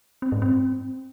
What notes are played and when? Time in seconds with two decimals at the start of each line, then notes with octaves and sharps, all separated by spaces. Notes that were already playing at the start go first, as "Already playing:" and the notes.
0.22 C4
0.32 G#2
0.42 C4